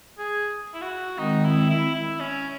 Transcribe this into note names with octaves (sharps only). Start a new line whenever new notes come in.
G#4
E4
F#4
D#3 G#3 C4 D#4
E4
E4
E4
C#4